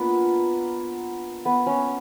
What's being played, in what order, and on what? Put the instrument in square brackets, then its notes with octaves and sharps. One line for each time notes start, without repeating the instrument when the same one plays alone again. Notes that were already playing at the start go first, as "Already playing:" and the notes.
Already playing: [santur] A#3 B3 D4 F4 B4
B3 B4
C#4 C#5